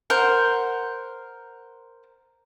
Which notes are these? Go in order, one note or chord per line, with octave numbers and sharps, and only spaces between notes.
A#4 C5 F#5